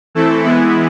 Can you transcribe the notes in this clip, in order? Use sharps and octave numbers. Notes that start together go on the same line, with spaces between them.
E3 A3 C4 E4 A4
E3 G#3 B3 E4